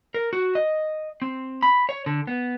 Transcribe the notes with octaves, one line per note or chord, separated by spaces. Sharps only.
A#4
F#4
D#5
C4
B5
C#5
D3
B3